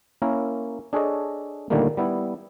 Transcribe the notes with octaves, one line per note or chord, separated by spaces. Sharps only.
A#3 C#4 E4 A#4
D4 G#4 A4 C#5 D#5
A#2 D3 D#3 G3 A3 A#3
G3 B3 E4